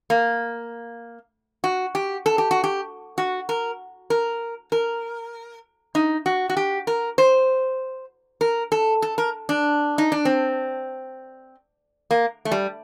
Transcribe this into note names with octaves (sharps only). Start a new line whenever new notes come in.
A#3
F#4
G4
A4
G4
F#4
G4
F#4
A#4
A#4
A#4
D#4
F#4
F#4
G4
A#4
C5
A#4
A4
A4
A#4
D4
D#4
D4
C4
A#3
A3
G3